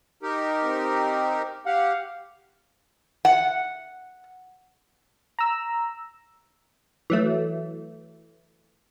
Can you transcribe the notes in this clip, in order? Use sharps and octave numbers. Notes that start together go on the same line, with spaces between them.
D#4 G4 A#4
C4
G4 F5 F#5
F#5
A#5 E6
E3 F#3 A3